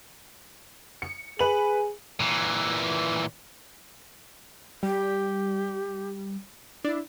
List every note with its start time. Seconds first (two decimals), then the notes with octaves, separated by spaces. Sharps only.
1.02 C#7
1.39 G#4 B4 F#7
2.20 A#2 E3
4.83 G3 G4
6.84 D4 E4